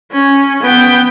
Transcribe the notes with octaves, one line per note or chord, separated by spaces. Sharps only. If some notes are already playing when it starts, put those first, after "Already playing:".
C#4
B3 G5